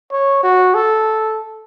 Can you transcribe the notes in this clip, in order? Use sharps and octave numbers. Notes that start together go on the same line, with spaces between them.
C#5
F#4
A4